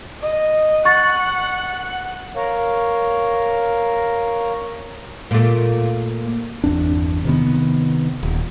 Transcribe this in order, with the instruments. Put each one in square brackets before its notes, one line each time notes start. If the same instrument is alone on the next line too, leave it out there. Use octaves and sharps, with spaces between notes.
[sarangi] D#5
[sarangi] F#5 [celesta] C#6 A6
[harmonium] A#4 C#5 F5
[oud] A#2 A3
[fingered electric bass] G1 E2 C4 D4
C3 D#3 B3
D#1